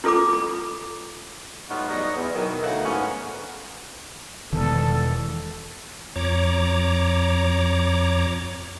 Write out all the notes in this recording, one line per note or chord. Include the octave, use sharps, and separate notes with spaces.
E4 F4 A4 B5 D6
B5
A2 G3 B3 D#4 F4 F#4
E2 F#3 G3 D#4 F#4 D#5
E2
B2 D#3 F#3
D2 E3 A3 D#4 F5 F#5
G#2 B3 C#4
E1 D#3 E3 G3 A4
F2 C#5 A#5 D6